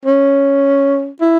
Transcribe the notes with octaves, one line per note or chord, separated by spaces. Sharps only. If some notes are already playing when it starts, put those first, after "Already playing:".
C#4
E4